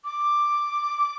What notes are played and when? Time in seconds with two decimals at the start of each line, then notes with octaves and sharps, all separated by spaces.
0.04 D6